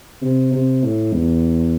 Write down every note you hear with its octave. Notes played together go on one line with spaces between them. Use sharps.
C3
C3
A2
E2